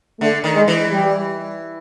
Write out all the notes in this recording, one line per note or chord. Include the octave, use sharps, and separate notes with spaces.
D3 A3
D#3
G#3
E3
G3